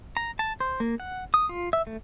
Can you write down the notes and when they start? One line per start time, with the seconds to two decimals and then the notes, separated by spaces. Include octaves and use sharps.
0.17 A#5
0.39 A5
0.60 C5
0.80 A#3
1.00 F#5
1.34 D#6
1.49 F4
1.73 E5
1.87 A3